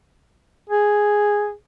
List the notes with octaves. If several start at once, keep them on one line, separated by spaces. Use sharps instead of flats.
G#4